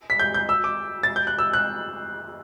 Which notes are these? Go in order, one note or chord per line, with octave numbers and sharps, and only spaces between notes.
B6
G6
G6
E6
D6
A6
G6
F#6
E6
F#6